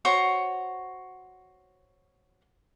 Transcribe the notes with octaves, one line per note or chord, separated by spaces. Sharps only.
F#4 C5 C#5 C#6